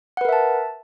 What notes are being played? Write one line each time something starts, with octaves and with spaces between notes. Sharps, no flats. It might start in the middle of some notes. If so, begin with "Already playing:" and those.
A#4 B4 E5 F#5 A5